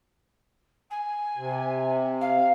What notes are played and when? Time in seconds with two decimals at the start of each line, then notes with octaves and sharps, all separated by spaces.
0.90 G#5
1.37 C3
2.20 F5